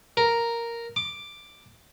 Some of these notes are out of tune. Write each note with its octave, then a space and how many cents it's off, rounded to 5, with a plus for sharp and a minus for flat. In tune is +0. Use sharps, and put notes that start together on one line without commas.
A#4 +0
D6 +5